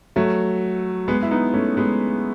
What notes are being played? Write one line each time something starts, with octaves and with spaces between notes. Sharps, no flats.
F#3 A3
G#3 B3
E4
B3 D#4
A3 C#4
G#3 B3